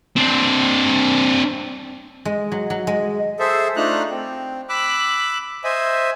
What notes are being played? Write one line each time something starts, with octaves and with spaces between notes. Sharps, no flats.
C4 D4
G#3
F#3
F#3
G#3
G#4 A4 C5 E5
A3 D4 D#4 F4 A#5 F#6
C4
B5 D6 E6 F#6
C5 D#5 E5 G#5